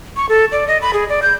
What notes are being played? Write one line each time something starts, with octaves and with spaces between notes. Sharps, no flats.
C#6
A4
D5
D#5
B5
G#4
D5
G6